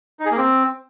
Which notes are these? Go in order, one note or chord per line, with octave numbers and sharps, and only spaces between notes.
D#4
G#4
A#3
C4